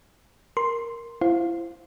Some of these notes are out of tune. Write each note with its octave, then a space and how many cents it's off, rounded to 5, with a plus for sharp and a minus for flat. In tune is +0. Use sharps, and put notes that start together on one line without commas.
A#4 +0 C6 +0
E4 +35 C5 +0 F5 +10